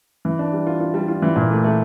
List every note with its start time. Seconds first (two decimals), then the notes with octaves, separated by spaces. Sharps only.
0.25 E3
0.39 D4
0.53 G3
0.67 F4
0.80 F4
0.94 G3
1.08 F4
1.22 E3
1.36 A#2
1.50 A3
1.64 A3